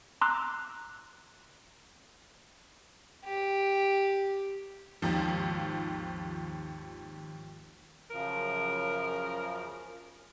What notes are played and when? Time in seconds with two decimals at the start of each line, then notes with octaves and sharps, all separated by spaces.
0.21 A#5 C6 D6 E6 F#6
3.24 G4
5.02 G#1 D#2 F3
8.10 F#2 C#3 F3 A#4